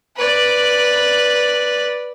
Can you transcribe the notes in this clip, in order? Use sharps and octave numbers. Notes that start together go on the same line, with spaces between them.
B4 D5